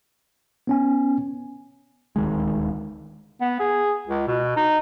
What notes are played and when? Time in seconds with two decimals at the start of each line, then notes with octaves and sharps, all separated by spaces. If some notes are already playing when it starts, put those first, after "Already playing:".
0.67 B3 C#4 G#5
2.16 D#1 D2 D#3 G#3
3.41 B3
3.60 G#4
4.07 C#2
4.27 B2
4.57 D#4